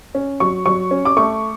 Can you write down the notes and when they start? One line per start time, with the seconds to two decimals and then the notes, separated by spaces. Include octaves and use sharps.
0.15 C#4
0.40 F#3 C#6
0.66 F#3 C#6
0.91 C#4
1.05 D6
1.17 A3 C#6